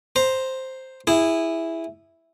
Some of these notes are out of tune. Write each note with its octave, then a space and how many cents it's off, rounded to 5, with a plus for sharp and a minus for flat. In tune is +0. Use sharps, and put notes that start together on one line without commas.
C5 +0 A#5 +0
E4 +0 G#4 -20